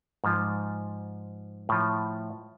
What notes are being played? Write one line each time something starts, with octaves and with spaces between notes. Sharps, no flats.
G#2 F3
A2 F3